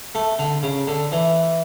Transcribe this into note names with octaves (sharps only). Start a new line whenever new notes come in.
A3
D3
C#3
D3
E3